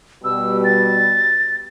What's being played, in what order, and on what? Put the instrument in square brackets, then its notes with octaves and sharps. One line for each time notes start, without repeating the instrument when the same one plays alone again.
[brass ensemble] B2 G3 [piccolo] E6
[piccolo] A6